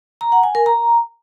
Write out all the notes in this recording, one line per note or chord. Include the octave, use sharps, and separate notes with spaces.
A#5
F#5
G#5
A#4
A#5